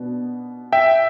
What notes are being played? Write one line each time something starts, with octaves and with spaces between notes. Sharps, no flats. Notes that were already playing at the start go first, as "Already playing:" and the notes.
Already playing: B2 B3 D4
E5 G5